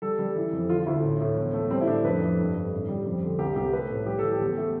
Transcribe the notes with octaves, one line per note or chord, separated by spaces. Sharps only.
G3 A4
G3
E3
F2
D3 F4
D2 E4
A2
A2
E2
A3
G3 C4
E4
A2 D4
F2 B4
F2
G2
G2
A2
G3
F2
D3
C2 G4
C2 G4
A3 B4
A2
G3 G4
E3 A4
G4
E2
A3